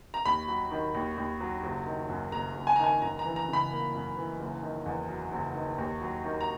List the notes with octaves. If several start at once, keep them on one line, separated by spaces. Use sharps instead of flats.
A#5
D#2 B5
F#3
D#3
D#2
D#2
F#3
F#1
D#3
F#2
F#1 A#5
F#1
G#5
D#3 A#5
G#5
F#2 A#5
A#5
E3
A#5
C#3
B5
A#3
F#2
E3
F#1
D#3
E2
F#3
F#1
D#3
D#2
F#3
D#3
A#5